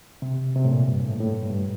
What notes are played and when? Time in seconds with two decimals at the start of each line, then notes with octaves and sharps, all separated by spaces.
0.22 C3
0.56 C3
0.65 A2
0.72 A#2
0.88 G2
1.00 A#2
1.04 A2
1.20 A2
1.31 G2
1.49 G2